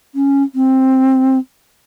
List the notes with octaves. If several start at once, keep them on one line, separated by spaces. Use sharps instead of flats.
C#4
C4